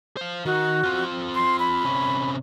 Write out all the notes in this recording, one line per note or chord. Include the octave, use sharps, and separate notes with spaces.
C5 F5
D#3 F#4
C4 F4
C6
B5
C3 C#4